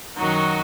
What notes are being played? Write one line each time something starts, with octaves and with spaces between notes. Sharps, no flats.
F#2 D#3 F#3 D#4 F#4